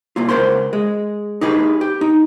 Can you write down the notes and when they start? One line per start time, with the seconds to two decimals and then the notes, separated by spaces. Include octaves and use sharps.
0.16 C2 A#3 F4
0.29 C#2 A3 A#4 C5 F5 C6
0.73 G#3
1.41 D#4 G4 G#4 B4
1.81 G4
2.01 D#4